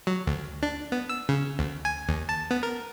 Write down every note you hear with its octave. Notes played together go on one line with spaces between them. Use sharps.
F#3
D2
D4
B3
E6
C#3
D2
G#5
D#2
A5
B3
A#4